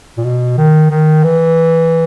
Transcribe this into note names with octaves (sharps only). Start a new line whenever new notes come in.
A#2
B2
D#3
D#3
E3